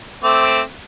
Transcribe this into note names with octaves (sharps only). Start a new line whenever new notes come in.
A3 C4 D6